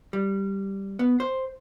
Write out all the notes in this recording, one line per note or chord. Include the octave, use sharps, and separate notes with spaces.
G3
B3
C5